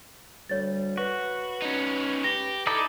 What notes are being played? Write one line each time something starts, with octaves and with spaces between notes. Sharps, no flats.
D2 G3 C#5 A6
F#4 B4
C#4 D#4
G4 A#6
D#4 E4 A4 D5